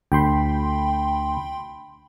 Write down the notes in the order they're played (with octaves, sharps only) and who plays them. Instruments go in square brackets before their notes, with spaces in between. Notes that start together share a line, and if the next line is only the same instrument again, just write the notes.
[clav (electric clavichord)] D2 [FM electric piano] G5 B5 C6